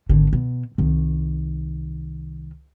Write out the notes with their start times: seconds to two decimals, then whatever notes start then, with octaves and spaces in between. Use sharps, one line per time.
0.09 G#1 D3
0.33 B2
0.78 C2 D#3